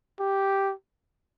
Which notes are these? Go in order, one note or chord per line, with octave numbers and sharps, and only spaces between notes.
G4